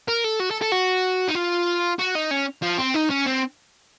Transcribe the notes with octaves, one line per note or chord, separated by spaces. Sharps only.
A#4
A4
F#4
A4
A4
F#4
D#4
F4
F#4
D#4
C#4
F3
C4
D#4
C#4
C4